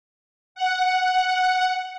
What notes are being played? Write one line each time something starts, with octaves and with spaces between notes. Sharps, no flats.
F#5